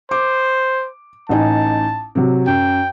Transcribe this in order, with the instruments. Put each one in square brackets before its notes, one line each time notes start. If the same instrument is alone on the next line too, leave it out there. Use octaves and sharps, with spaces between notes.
[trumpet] C5 [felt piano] D6
[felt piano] A1 D#4 G#5 [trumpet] A5
[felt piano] C3 F#3
[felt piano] F#2 [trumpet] G5